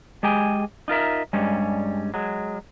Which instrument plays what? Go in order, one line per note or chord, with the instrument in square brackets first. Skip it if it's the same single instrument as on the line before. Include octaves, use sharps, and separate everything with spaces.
[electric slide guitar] G#3 G4 G#4 G5 G#5
D#4 F4 A#4 E5
G2 G3 G#3 C#4
F#3 G#3